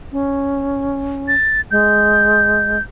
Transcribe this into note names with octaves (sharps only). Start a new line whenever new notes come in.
C#4
A6
G#3 G6